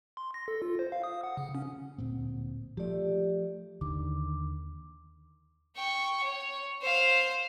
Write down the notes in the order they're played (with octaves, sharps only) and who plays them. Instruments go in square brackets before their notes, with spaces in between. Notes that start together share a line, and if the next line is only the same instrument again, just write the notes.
[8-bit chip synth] C6
A#6
A4
F4
C5
F5
D#6
F#5
C#3
C#4
[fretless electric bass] D1 A#2 C4
[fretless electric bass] F3 A3 [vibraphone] G4 D5
[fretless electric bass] D#2 D3 D#3 [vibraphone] D6
[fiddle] G5 C#6
C#5
C5 F5